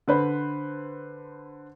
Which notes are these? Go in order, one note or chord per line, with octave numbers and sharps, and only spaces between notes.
D3 B4 C5